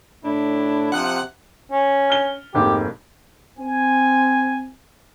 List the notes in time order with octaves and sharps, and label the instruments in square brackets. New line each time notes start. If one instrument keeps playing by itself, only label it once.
[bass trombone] A2 [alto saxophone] D4 [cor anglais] E4
[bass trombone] C3 [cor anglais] F3 [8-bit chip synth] F#5 F#6
[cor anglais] C#4
[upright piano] F6 G7
[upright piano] F1 G#2 A#3 [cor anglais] G4
[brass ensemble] C4 G#5